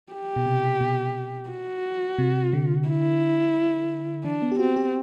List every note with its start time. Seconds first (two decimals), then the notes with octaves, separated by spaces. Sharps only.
0.13 G4
0.36 B2
0.46 C3
0.81 B2
1.50 F#4
2.18 C3
2.53 D3
2.88 E4
4.25 E3 D4
4.42 B3
4.52 G4
4.59 C4 F#4
4.76 G4